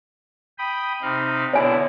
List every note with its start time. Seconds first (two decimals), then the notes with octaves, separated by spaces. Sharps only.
0.58 G5 B5 D#6
1.02 C3 D#4 F5
1.53 B2 D3 E4 C#5 G#5